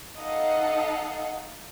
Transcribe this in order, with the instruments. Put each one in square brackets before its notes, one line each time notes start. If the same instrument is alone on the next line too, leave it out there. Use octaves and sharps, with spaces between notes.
[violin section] D#4 A4 D#5 F5 F#5